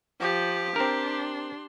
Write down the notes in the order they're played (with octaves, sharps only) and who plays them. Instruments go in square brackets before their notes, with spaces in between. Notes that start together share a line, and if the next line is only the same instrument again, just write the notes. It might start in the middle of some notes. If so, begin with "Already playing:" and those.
[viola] F3 [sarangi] G4
[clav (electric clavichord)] C4 A#4 [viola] D4 C6